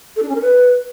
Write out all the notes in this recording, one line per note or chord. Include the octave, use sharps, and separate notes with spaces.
A4
D4
C#4
A#4
B4